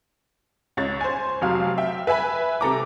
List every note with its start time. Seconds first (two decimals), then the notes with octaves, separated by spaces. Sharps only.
0.77 C#2 C#5 A6
1.01 C5 G#5
1.41 F1 C3 F#3 F5
1.78 E5 G5
2.07 B4 E5 G#5 B5
2.61 C3 A4 A#5 D6